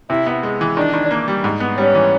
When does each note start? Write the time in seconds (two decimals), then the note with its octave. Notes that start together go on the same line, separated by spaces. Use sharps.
0.10 C3 E4
0.26 B3
0.43 G#3
0.61 E3
0.76 D#3 D4
0.93 D#3
1.11 A#3
1.28 G3
1.44 G#2
1.60 B3
1.78 G3 C#4
1.95 E3